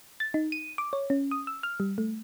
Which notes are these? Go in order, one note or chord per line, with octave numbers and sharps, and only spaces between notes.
A6
D#4
D#7
D6
C#5
C#4
D#6
E6
F6
G3
A3